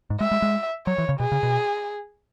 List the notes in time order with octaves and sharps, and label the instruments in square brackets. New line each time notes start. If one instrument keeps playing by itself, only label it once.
[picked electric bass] G#2
[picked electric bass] G#3 [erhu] E5
[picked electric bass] G#3
G#3
[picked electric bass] F#3 [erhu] C#5
[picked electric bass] E3
C#3
[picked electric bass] B2 [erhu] G#4
[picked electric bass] C#3
B2